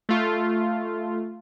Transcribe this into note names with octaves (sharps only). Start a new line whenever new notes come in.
A3 F4